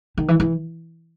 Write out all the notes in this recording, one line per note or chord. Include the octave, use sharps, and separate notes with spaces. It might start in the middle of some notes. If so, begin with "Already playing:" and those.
D#3
E3
E3